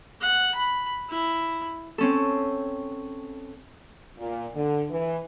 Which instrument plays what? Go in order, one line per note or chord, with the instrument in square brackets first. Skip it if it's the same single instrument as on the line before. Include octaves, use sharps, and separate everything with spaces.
[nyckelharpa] F#5
B5
E4
[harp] C4 C#4 A4
[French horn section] A#2
D3
E3